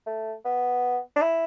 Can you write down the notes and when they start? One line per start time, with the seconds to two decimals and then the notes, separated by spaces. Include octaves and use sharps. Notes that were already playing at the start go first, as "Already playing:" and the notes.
0.07 A3
0.45 B3
1.16 D4
1.22 E4